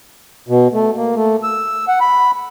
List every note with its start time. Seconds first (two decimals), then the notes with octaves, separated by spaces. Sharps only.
0.49 B2
0.73 A3
0.97 A#3
1.16 A3
1.43 E6
1.88 F#5
2.01 B5